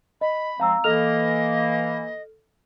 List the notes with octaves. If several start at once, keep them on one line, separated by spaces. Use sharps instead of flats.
D#5 B5
F3 G#3 C4 F5 A#5 E6
E3 A#3 A4 D#5 F6 F7